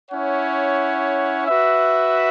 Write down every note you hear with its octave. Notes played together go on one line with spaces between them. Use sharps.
C#4 E4 C#5 F#5
F#4 B4 E5